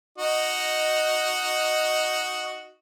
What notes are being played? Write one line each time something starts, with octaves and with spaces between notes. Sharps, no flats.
D#4 F#4 D#5